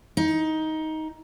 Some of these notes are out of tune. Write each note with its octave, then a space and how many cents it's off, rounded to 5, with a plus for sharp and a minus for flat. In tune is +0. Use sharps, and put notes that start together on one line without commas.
D#4 +15